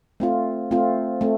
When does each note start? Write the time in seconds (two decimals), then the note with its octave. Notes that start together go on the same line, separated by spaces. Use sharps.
0.20 A3 C4 F4
0.71 A3 C4 F4
1.21 A3 C4